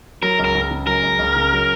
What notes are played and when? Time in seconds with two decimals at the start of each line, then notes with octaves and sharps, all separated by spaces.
0.22 F#3 A#4
0.39 C#2
0.44 A#4
0.55 C#2
0.71 C#3
0.87 F#3 A#4
1.03 C#2
1.19 C#2
1.36 C#3
1.52 F#3